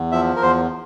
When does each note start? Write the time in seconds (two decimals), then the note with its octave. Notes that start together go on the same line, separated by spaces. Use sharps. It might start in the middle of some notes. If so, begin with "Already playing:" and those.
Already playing: E2
0.12 F3 E5
0.36 A#4
0.42 E2 C5